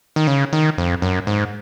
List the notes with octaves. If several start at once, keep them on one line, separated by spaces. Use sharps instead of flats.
D#3
C#3
D#3
F2
F#2
G#2